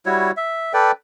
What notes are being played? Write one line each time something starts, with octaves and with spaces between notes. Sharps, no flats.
G3 E4 F#4 C#5
E5
A4 B4 D5 G5